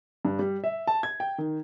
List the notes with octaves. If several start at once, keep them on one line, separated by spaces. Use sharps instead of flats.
G2
G3
E5
A5
G#6
G5
D#3